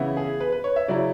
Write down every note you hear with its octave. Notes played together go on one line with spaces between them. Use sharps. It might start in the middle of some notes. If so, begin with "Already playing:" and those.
Already playing: C#3 E3 B3 E4
G#4
B4
B4
C#5
E5
C#3 F#3 C#4 E4 D5